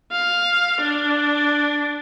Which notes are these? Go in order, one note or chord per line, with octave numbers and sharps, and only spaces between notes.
F5
D4